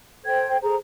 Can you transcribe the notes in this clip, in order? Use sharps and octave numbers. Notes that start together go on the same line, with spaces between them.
A4 C5 G5 G#6
G#4 A4 C5 A#5